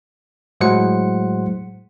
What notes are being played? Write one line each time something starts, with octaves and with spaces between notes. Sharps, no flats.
A2 F#3 G#3 C5 F#5 C#7